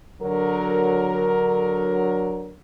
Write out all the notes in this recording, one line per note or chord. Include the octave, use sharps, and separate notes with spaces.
D3 F#3 A#4